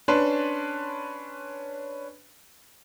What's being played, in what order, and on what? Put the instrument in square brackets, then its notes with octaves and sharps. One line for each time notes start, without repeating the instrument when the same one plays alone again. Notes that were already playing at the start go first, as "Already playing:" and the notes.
[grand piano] C#4 D4 B4 A5 C6